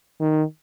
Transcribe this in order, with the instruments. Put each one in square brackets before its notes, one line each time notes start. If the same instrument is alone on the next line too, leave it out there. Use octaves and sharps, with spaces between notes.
[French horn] D#3